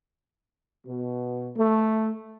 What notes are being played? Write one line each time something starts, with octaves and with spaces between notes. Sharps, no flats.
B2
A3